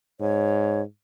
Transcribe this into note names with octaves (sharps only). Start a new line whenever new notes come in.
G#2 C#5